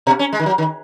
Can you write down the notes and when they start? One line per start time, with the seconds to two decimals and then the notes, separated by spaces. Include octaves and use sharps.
0.07 B2
0.19 C#4
0.33 G#3
0.40 D#3
0.46 F#3
0.58 D#3